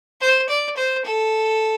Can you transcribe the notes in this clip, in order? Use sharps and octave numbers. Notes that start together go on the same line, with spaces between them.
C5
D5
C5
A4